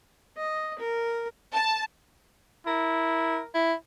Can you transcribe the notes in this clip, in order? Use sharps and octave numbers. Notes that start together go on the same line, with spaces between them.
D#5
A#4
A5
E4 A#4
E4